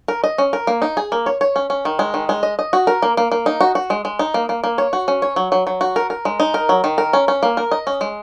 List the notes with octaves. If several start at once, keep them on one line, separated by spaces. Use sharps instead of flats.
A#4
D#5
C#4
A#4
A#3
D#4
G#4
A#3
C#5
C#5
C#4
C#4
D#3
G#3
D#3
G#3
D#5
D#5
F#4
A#4
A#3
A#3
A#3
D#4
F#4
F#4
G#3
G#3
D#4
A#3
A#3
A#3
C#5
F#4
C#4
C#5
F#3
F#3
F#3
F#4
A#4
A#4
G#3
D#4
A#4
F#3
D#3
A#4
C#4
C#4
A#3
A#4
D#5
C#4
G#3